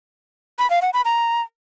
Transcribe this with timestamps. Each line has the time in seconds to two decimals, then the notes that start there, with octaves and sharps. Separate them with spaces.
0.59 B5
0.70 F5
0.82 F#5
0.94 B5
1.05 A#5